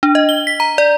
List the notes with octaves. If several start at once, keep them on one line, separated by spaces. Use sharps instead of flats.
D4
D#5
G7
B6
A#5
D5